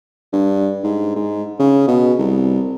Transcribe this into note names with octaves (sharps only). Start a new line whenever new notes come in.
G2
G#2
G#2
C#3
B2
C2